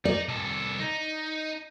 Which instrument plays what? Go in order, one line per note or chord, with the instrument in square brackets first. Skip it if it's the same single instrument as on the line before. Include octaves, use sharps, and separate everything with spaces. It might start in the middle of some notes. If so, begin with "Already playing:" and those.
[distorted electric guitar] D#4 [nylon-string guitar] D5
[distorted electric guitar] C2 A4
D#4